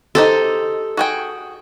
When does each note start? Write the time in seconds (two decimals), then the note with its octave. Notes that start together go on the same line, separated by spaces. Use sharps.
0.15 D#4 G4 A4 C5
0.97 F#4 G#4 G5